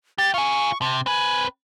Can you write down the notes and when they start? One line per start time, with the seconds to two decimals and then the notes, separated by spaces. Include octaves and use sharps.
0.18 G4 A6
0.34 F4 G#4 C#6
0.82 C3 A5
1.06 C4 B4 G#5